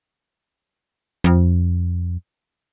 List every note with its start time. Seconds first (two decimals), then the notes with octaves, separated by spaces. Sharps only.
1.24 F2